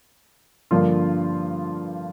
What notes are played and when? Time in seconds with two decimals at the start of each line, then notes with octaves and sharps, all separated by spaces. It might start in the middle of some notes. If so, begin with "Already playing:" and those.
0.71 G2 D3 F3 A#3 F4